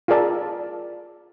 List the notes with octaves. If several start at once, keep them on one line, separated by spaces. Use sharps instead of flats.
F4 G#4 A#4 D5 A5